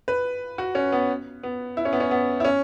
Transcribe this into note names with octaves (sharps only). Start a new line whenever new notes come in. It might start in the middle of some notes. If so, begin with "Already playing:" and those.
B4
F#4
C#4
B3
B3
E4
C#4
B3
C#4
B3
E4
C#4